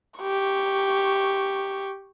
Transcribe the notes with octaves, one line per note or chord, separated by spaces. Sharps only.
G4 C#6